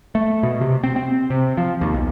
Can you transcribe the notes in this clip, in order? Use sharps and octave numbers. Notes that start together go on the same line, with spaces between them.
A3
B2
C3
C4
C4
C3
F3
D#2
B1